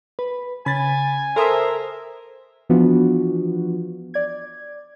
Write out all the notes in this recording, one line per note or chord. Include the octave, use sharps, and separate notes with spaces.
B4
C#3 G#5 B5 A6
A4 A#4 C5 E5 C6 D#6
E3 F3 B3 D4 F4 F#4
D5 G#6